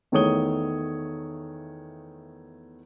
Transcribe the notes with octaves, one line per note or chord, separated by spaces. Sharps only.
E2 D#3 A3 C#5 D#6 G7